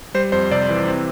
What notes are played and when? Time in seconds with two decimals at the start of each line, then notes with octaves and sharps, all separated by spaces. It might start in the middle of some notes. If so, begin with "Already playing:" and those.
0.14 G3 C5
0.32 F2 C5
0.51 C3 D5
0.69 E3
0.88 C4